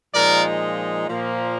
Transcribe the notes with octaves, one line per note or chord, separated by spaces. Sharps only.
A#2 F3 G#3 D#4 A#4 D5
A#2 F3 A#3